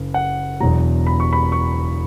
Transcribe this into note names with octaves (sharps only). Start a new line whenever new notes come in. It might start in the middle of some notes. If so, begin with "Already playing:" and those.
Already playing: F#1
F#5
E1 E2 B2 F#3 A#5
B5
C#6
B5
C#6